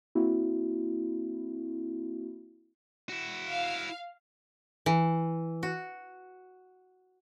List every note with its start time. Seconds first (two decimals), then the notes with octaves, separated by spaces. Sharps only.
0.15 A#3 C4 E4 F#4
3.09 E4 F#4
3.47 F5
4.86 E3
5.63 F#4